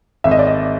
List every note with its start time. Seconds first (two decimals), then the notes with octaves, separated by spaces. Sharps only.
0.24 G#1 E5
0.31 D#5
0.39 D5
0.47 D#5